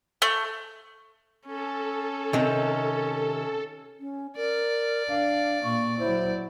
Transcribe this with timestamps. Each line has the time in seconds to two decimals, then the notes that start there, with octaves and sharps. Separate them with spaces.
0.22 A3
1.47 C#4 A4
2.33 C3 D#3
4.00 C#4
4.36 A#4 D5
5.09 D4 F5
5.63 A#2 A#3 C#6
5.99 F#3 E4 C5